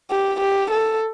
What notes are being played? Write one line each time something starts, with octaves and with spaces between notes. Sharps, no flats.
G4
G4
A4